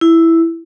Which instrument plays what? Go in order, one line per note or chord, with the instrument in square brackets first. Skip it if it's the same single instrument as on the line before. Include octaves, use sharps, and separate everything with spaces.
[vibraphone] E4